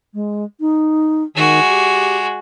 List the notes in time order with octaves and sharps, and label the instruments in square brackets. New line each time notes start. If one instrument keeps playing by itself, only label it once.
[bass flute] G#3
D#4
[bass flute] D#3 [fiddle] G#3 F#4
[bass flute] G4